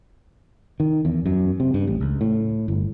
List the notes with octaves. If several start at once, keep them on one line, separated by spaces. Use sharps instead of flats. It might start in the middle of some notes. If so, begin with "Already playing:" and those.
D#3
E2
F#2
C3
G2
A1
C#2
A2
G1